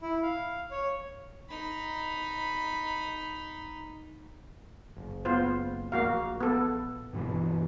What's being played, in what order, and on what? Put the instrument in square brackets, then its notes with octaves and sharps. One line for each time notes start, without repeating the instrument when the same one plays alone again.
[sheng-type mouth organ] E4
F5
C#5
[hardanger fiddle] D#4 B5
[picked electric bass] F#1
[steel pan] B3 F4 C5
[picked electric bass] A#1 [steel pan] A#3 F#4 F5
[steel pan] B3 A4
[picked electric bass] G2 B2 E3